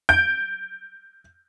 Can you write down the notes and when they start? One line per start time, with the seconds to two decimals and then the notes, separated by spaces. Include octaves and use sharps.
0.09 G6 D7